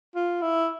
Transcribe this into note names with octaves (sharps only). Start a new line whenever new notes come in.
F4
E4